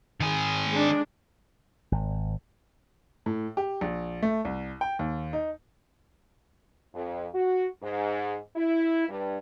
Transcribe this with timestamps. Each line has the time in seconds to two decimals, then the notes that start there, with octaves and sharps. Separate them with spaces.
0.20 D#3 G#4
0.68 G#3 D4
1.92 G#1
3.26 A2
3.57 G4
3.81 A#1
4.23 A3
4.45 C2
4.81 G5
4.99 D#2
5.33 D#4
6.94 F2
7.34 F#4
7.82 G#2
8.56 E4
9.09 G2